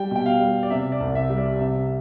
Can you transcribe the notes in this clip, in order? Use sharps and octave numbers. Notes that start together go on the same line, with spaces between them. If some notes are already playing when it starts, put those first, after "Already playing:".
Already playing: G3 G5
B2 G5
F5
G3
D5
C3 E5
D5
C2
E5
G3
D5
C3 E5